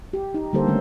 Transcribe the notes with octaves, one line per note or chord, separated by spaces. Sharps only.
G4
D#4
D3 G3 A#3 G4 A4 C5
D3 D#3 G3 A3 B3 C#4